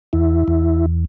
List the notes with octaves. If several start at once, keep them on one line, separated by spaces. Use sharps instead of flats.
E2 E4
E2